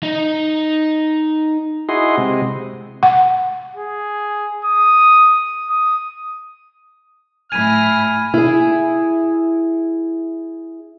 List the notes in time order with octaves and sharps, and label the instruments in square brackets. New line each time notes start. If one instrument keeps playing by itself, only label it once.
[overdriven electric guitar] D#4 D#5
[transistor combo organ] E4 F#4 G#4 D#5 C6
C3 G#3
[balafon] F#5
[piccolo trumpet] G#4
D#6
D#6
[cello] A2 E4 [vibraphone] G#5 B5 [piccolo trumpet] F6 [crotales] G#6 D#7
[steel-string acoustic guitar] E4 G#4